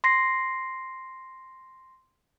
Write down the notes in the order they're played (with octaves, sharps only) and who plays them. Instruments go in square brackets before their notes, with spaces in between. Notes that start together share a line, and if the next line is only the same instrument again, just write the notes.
[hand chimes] C6 A#6 C7